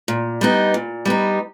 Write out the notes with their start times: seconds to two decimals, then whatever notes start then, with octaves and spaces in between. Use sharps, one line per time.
0.08 A#2
0.41 G3 B3 D#4
0.74 A#2
1.05 G3 B3 D#4